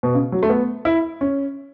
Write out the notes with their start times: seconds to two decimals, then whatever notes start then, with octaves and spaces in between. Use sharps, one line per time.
0.03 B2
0.15 C#3
0.32 F#3
0.43 A3
0.49 B3
0.85 E4
1.21 C#4